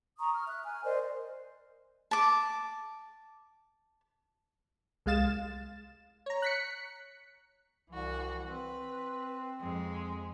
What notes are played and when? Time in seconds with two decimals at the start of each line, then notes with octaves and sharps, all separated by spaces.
0.19 A#5 C#6 D#6
0.33 F6
0.47 E5 F#6
0.64 G#5 F6
0.84 A#4 C5 D5 D#5
2.11 A5 D6
5.06 C2 G#3 F5 A6 E7
6.26 C#5 A#5
6.42 F#6 B6 C#7
7.90 C2 E3 F#4
8.46 C4 B4
9.60 F2 G#3